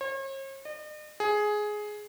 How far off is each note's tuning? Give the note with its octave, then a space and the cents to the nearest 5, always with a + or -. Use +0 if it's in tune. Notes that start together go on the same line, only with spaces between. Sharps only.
C#5 -45
D#5 -45
G#4 +10